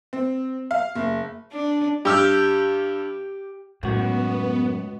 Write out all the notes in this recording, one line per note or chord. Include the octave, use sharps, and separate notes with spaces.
C4
F5
F#1
D4
G2 G4 E6 F6
C#2 F#2 A2 B3 F#4